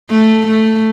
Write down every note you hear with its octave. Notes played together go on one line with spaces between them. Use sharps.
A3
A3